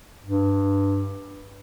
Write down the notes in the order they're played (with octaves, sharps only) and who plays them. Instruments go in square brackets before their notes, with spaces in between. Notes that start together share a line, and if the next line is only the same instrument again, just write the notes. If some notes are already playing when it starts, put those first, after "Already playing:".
[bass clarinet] G2